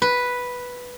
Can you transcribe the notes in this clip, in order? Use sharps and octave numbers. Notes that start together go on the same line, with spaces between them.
B4